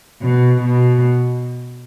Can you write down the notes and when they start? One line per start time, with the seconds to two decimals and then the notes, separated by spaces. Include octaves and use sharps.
0.21 B2
0.61 B2